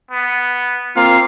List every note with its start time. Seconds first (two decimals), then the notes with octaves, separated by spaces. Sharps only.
0.11 B3
0.96 A#3 C4 F4 F5